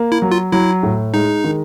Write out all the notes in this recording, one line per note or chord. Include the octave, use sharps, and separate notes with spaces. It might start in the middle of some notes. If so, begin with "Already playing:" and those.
Already playing: A#3
E4
F#3
F4
F#3 E4
A2
G#3 D#4
D#3